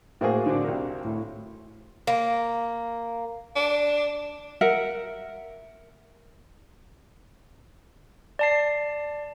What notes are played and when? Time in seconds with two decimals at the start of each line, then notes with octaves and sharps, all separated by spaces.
0.21 A2 A#3 F#4 G#4 C5 F5
0.46 D3 C4 D4
0.64 C2 A#4
1.04 A2
2.07 A#3
3.56 D4
4.61 A#4 E5 F#5
8.39 D5 A5 C7